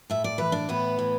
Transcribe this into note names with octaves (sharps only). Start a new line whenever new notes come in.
A2 E5
D5
E3 B4
D4 D5
A2 B3 B4
E3